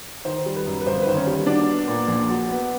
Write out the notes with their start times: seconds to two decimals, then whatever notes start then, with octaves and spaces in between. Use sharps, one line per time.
0.25 D#3 C5
0.46 G3
0.56 B4
0.66 F#2
0.81 B4
0.87 G1 C5
1.02 B4
1.06 D#3 C5
1.16 C#4 C#5
1.27 G3
1.46 F#3 D4 D5
1.68 B3
1.88 A#2
2.08 A#1
2.28 F#3
2.49 B3